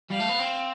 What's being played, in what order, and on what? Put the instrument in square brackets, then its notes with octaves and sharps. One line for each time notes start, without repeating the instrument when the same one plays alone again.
[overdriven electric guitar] G3 [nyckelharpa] F5
[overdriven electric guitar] A3
B3
C4